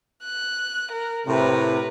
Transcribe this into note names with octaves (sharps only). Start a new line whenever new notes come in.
F#6
A#4
A2 C3 A#4 B4